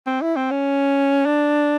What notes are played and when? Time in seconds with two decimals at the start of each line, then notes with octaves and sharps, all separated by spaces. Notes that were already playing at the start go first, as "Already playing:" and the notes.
0.06 C4
0.21 E4
0.36 C4
0.51 C#4
1.26 D4